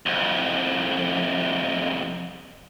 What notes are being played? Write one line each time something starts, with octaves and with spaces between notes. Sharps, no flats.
C2 F2